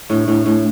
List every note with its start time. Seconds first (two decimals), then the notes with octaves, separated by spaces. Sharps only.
0.09 A2 D4
0.28 A2
0.46 A2 A3